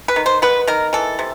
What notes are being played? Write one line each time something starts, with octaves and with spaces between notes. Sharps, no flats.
B4
D#3
C5
B3 B4
D#3 A#4
E3 A4
C3